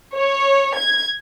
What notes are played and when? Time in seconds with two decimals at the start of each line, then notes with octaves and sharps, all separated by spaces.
0.18 C#5
0.78 G#6